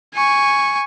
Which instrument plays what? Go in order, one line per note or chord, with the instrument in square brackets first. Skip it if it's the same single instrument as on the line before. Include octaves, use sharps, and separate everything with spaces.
[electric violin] G#5 C#6